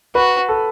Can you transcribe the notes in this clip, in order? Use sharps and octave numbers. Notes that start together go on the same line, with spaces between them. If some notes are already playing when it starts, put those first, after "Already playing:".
F#4 B4
A4